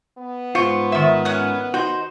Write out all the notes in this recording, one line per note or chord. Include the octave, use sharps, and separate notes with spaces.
B3
G#2 F4 C5 C#6
D#3 E5
C#4 F#5
D#4 F#4 C5